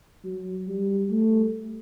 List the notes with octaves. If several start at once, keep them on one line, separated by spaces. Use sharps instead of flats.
F#3
G3
A3